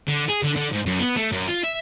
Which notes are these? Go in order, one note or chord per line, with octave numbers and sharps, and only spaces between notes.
D3
G#4
D3
D3
G#2
F#2
B3
A3
F#2
F4
E5